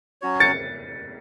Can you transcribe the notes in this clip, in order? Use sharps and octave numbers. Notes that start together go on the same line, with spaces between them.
F#3 C#4 F#4 C#5
A6 C#7